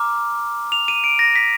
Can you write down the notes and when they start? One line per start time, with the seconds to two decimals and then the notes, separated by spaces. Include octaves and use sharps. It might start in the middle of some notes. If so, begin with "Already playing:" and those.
Already playing: A#5 D6 F6
0.72 F7
0.88 D#7
1.04 D7
1.19 A#6
1.36 B6